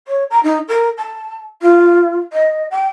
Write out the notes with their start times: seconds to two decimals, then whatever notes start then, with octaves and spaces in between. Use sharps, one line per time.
0.07 C#5
0.30 A#5
0.43 D#4
0.68 A#4
0.97 A5
1.61 F4
2.32 D#5
2.70 G5